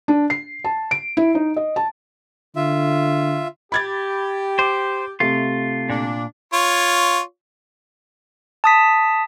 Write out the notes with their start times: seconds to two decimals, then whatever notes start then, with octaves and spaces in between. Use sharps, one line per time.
0.08 D4
0.30 C7
0.64 A5
0.91 D7
1.17 E4
1.35 D#4
1.56 D#5
1.76 A5
2.56 D3 F4 E5
3.72 G4 B5 G#6 A6
4.59 C5 D6
5.20 C3 A3 F4
5.90 A#2 D4
6.53 F4 C#5
8.64 A5 D#6 B6